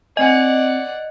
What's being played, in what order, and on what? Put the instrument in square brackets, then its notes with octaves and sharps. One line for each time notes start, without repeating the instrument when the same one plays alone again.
[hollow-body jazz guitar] C4 G#5 [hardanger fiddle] D5 F#5 [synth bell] D#5